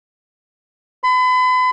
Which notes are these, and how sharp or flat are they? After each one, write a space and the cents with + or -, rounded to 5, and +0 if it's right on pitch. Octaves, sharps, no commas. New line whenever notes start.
B5 +40